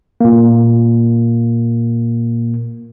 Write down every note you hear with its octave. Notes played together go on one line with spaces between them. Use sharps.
A#2 A#3